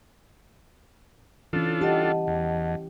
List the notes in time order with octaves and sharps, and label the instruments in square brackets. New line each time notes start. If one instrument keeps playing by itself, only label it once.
[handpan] E3 C#4 [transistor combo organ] D4 F4 A4
[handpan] G4 [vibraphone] D#5 F#5 A5
[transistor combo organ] E2